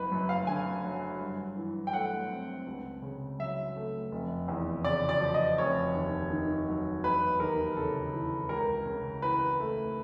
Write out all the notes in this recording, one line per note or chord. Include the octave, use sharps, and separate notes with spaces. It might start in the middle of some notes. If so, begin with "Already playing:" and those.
Already playing: F#1 B4
F#2
F5
D3 G#5
F#3
G2
E3
G5
A3 F#5
C4
C#2
C#3
F#3 E5
A3
F1
E2
C#3 D5
D5
F3
D#5
F1 C#5
D#2
D#3
F#3
E1 B4
D#2 A#4
C#3 A4
E3
C#2 A#4
C#3
E3 B4
A3